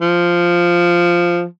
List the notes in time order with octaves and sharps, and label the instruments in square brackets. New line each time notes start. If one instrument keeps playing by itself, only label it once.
[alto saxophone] F3